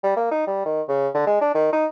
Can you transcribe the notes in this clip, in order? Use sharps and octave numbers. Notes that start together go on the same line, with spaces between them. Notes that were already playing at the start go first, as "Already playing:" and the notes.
G3
A#3
D#4
G3
D#3
C#3
D3
G#3
D4
D#3
D#4